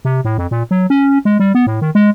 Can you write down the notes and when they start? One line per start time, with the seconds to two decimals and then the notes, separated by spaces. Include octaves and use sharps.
0.05 C3
0.25 A2
0.38 F2
0.51 A#2
0.71 F#3
0.90 C#4
1.25 G#3
1.40 G3
1.55 B3
1.67 A2
1.81 D#3
1.95 G#3